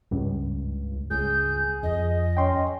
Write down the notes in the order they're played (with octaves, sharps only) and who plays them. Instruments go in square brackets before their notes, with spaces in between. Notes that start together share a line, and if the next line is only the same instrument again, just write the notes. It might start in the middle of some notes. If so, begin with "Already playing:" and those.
[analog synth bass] C#2 [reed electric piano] G2
[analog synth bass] C#2 [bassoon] G#4 [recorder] G6
[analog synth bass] F2 [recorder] D#5
[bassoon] C#4 [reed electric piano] G5 C6